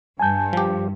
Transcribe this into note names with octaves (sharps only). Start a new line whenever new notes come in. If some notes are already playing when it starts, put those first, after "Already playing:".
G2 G#5 A5 G6
F3 G4